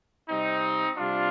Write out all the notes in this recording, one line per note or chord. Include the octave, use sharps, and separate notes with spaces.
C3 G3 C4 D#4
C3 G3 D4 F4